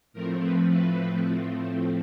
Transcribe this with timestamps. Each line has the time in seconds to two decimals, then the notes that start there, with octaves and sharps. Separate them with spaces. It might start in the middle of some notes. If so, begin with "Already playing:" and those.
0.13 A2 F3 A3 C4 A#4
0.42 B4
0.70 B4